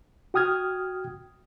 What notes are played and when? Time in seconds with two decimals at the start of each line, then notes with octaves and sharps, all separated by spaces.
0.34 F#4 G5 D#6 F6 G#6